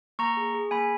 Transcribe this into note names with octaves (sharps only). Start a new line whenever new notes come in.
A#3 A#5 C#6
G#4
G#4
A#3 G#5 B5